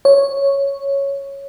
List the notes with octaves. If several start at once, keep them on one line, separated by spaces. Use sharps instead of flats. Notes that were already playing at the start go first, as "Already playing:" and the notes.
C#5